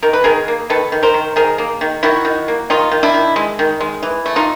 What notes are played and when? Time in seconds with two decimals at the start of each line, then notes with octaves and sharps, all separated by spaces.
0.03 D#3 A#4
0.13 B4
0.24 D#3 G#4 A#4
0.48 A#3
0.70 D#3 A4 B4
0.92 D#3
1.03 A#4 C5
1.14 D#3
1.36 D#3 G#4 A#4
1.58 A#3
1.81 D#3
2.03 D#3 E4 F#4
2.25 D#3
2.48 A#3
2.70 D#3 D#4 F4
2.91 D#3
3.03 D4 E4
3.14 D#3
3.36 G#3
3.59 D#3
3.80 G#3
4.03 E3
4.26 A3
4.36 D#4 F4